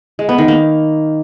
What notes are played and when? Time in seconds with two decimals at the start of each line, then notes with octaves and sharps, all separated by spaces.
0.19 G#3
0.29 B3
0.38 D#3
0.48 A#3